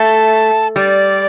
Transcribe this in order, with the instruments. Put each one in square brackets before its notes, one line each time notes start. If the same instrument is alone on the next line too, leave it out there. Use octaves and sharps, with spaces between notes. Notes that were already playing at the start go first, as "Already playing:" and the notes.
Already playing: [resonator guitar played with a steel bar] A3 [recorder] A5
[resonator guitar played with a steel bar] G3 [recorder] D5